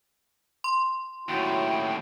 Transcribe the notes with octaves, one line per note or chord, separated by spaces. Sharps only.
C6
D#2 A2 C#4 E4 F#4 G5